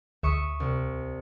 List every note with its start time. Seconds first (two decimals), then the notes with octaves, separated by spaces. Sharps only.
0.23 D2 E5 C#6 D#6
0.60 C2